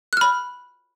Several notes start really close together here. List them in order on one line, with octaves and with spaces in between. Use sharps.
F#6 F6 B5